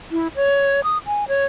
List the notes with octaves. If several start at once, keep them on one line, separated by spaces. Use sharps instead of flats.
E4
C#5
D#6
G#5
C#5